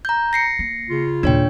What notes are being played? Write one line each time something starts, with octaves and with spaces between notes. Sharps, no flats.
A#5 G6
A#6 C7 C#7
A#3
C#3 F4
D#2 A#2 D4 C#5 G5